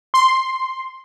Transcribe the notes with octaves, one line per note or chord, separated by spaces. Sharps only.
C6